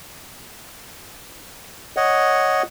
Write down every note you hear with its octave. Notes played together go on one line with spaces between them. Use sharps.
C#5 D#5 F#5